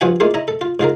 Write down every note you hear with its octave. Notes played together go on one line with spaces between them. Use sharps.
G2 F3 F4 F#4 F#5 G#5
G#3 A#3 E4 F4 G#4
E4 D#5 A#5
A4
F4
G#2 F4 G#4 A#4